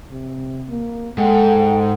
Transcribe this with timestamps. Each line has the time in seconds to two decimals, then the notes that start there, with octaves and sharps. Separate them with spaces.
0.11 C3
0.70 A#3
1.18 G#2 A4 F#5 G5